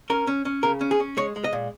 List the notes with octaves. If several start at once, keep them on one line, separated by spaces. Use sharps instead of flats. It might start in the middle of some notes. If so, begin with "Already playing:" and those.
C#4 A#4
C#4
C#4
C#3 A#4
C#4
G#4
C#4
G#3 C#5
G#3
D#5
A#2